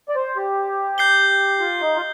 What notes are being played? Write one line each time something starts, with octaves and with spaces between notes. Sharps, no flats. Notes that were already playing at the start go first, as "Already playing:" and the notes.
D5
C5
G4
G6 C7 G7
F4
D#4
F4